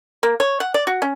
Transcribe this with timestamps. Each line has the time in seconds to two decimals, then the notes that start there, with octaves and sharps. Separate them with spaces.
0.23 A#3
0.40 C#5
0.60 F#5
0.74 D5
0.87 F#4
1.02 C#4